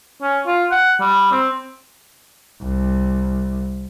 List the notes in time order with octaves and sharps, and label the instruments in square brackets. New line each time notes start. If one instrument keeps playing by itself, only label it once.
[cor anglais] C#4
F4
F#5
G3
C4
[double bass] C2